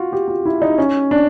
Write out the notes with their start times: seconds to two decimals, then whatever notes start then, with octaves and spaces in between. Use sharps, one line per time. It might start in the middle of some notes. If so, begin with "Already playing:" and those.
Already playing: F4 F#4
0.13 G4
0.28 F4
0.45 E4
0.62 D#4
0.78 C#4
1.11 D4